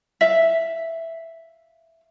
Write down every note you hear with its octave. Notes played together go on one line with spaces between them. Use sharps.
E5 F5